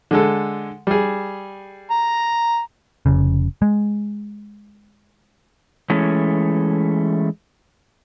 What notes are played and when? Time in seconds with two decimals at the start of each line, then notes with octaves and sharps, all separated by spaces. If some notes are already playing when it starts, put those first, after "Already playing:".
0.11 D3 G#3 A4
0.87 G3 G#4
1.91 A#5
3.06 F1 C#3
3.62 G#3
5.90 E3 G#3 A3 C#4